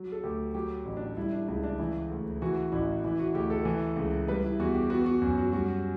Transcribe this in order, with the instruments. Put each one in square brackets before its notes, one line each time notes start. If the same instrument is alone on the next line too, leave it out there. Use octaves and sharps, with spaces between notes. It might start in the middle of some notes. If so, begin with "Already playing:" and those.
Already playing: [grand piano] F#3
A4
D2 G4
F#3 G4
A1
D4
G3 E4
D4
C#2 E4
D4
E3 E4
D2
E3 F#4
A1 E4
E3 E4
F#4
D2 G4
A4
E3
C#2
G3 B4
E4
E2 F#4
G4
B3 F#4
F#4
F#2
F#4
G3 F#4